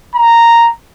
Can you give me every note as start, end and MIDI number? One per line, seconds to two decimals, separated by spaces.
0.15 0.70 82